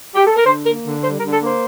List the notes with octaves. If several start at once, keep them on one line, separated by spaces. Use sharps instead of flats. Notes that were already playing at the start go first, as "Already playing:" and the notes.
G4
A4
A#4
D3 C5
A#3 A#4
D3
G3 C5
A#4
D3
A4
A#3
C5